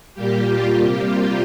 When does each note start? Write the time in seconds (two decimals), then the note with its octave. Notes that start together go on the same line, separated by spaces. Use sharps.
0.15 A#2 G3 A#3 G4
0.46 F4
0.76 C3 G3 A#3 G4
1.07 F4